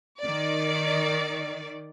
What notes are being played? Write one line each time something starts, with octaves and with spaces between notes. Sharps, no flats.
D#3 D5